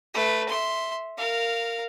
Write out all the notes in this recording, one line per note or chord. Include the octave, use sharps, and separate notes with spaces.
A3 B4
E5 C6
A#4 F5